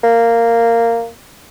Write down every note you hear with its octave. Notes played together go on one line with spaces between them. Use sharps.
A#3